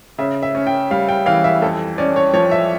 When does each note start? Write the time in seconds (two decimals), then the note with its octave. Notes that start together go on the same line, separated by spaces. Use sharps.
0.18 C#3 E5
0.43 E5
0.55 C#4
0.67 G5
0.91 G3 F5
1.09 G5
1.26 E3 F5
1.44 E5
1.62 F2 A4
1.98 C#4 D5
2.16 C#5
2.33 F3 C#5
2.51 E5